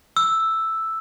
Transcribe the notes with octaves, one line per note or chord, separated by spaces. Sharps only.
E6